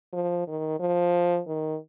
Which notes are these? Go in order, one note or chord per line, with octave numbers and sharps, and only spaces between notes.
F3
D#3
F3
D#3